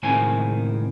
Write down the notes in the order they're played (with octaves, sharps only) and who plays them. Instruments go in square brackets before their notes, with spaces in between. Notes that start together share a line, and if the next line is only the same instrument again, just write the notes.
[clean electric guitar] C#2 A2 D#3 C4 G#5